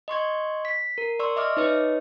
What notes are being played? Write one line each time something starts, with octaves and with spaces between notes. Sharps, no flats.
D#5 C6 C#6 G#6
B6
A#4
D5 C6 C#6 E6
D#5 E5 D6 F6
D#4 B4 C#5 D#5